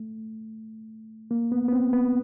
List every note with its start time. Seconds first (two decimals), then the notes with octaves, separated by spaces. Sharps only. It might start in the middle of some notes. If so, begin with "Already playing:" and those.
Already playing: A3
1.31 A#3
1.52 B3
1.68 B3
1.73 C4
1.93 B3